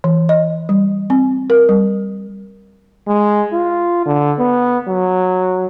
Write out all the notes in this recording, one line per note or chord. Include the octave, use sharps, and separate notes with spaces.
E3
D#5
G3
C4
A#4
G3
G#3
F4
D3
B3
F#3